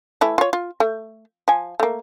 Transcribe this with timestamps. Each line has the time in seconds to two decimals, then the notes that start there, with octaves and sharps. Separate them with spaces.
0.21 E3 A3 E4
0.38 F4 C#5
0.53 F4
0.80 A3
1.48 F3 G#5
1.80 A3 A#3